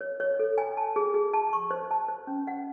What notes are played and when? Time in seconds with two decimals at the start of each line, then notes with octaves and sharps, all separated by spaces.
0.01 C#5
0.20 C#5
0.39 A4
0.58 G#5
0.77 A5
0.96 G#4
1.14 G#4
1.33 A5
1.53 C#6
1.71 C5
1.91 A5
2.08 C5
2.27 C#4
2.47 F#5